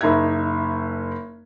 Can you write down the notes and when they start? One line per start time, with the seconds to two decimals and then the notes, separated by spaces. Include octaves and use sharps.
0.01 F#1 D#4 E5 G#6